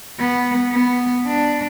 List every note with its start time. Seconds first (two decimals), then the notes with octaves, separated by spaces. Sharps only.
0.19 B3
0.72 B3
1.27 D4